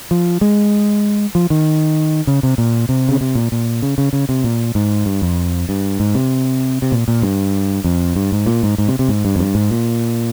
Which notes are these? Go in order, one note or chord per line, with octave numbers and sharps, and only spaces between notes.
F3
G#3
F3
D#3
C#3
C3
A#2
C3
C#3
C3
A#2
A#2
C#3
C#3
C#3
C3
A#2
G#2
G2
F2
G2
G#2
C3
C3
A#2
A#2
G2
F2
G2
G#2
A#2
G#2
G#2
C3
C3
G#2
G2
F2
G2
G#2
A#2